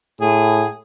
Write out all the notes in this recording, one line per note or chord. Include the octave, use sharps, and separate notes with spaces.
A2 G#4